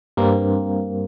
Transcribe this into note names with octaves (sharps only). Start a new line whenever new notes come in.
G2 A#3 C4